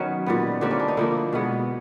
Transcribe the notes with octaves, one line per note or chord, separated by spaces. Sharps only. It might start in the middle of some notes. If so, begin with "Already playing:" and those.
Already playing: D#3 F#3 B3 C#4
A#2 G3 B3
D3 G3 A#3 C4
C#4
D4
D#4
D3 F3 A#3 E4
B2 G#3 B3